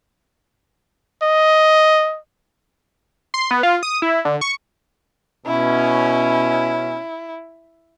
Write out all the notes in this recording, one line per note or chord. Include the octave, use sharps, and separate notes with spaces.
D#5
C6
B3
F4
D#6
E4
D3
C#6
B2 C#4 E4